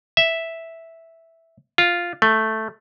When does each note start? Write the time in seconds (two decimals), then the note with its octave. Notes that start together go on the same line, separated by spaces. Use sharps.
0.17 E5
1.78 F4
2.22 A3